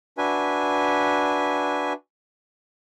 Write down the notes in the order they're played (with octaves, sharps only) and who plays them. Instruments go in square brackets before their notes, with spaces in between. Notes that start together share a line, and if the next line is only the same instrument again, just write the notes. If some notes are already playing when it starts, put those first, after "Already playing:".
[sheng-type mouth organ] D4 F#4 B4 E5 G#5